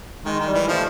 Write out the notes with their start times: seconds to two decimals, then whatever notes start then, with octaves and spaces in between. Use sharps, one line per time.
0.25 D#3 G#3
0.40 D#3
0.47 G3
0.54 E3
0.68 F3 A3